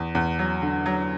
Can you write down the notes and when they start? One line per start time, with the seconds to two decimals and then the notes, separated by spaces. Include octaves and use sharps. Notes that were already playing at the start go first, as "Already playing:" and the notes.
Already playing: E2
0.15 E2
0.39 F#3
0.62 D3
0.86 F#3